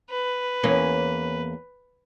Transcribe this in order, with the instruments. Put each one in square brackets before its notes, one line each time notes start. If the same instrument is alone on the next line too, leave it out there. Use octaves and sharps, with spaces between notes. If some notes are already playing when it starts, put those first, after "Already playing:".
[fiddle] B4
[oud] E2 A#3 C#4